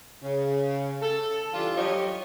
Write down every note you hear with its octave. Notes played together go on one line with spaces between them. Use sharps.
C#3
A4
E3 G3 D4 F4
F#3 G3 D#4 G4 C#5 D#5